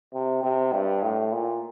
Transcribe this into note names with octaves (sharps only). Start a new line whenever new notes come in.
C3
C3
G2
A2
A#2